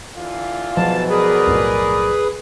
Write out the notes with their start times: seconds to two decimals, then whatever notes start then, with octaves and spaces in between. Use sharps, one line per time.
0.17 D3 E3 F4
0.77 G#2 B2 F3 F#3 A5
1.10 G#4 A#4 B4 D5
1.47 B1 F2 A2